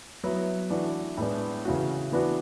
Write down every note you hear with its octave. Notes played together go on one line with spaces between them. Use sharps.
F#3 B3 E4
E3 A3 D4 F#4
A2 G#3 B3 D4
C#3 E3 A3 C#4 F#4
E3 B3 D4 F#4